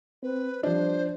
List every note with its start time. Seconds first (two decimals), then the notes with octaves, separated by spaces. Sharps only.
0.23 C4 B4
0.63 F3 G3 D4 C5